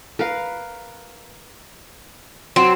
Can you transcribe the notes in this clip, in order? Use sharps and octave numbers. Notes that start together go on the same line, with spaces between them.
A#4 B4 F5
F#3 C4